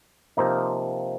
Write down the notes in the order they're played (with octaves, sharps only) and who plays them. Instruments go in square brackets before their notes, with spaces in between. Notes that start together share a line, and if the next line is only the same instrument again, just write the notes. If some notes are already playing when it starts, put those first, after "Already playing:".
[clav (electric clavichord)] C3 F3 A#3 D#4